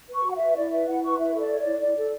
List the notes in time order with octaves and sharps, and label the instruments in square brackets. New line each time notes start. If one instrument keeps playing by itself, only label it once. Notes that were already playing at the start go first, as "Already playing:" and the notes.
[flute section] B4
C#6
F#4
F#5
E5
B4
E4 D5
B4 E5
E4 F#5
B4 C#6
E4 E5
A4
D5
C#5
D5
E4
E4 D5
A4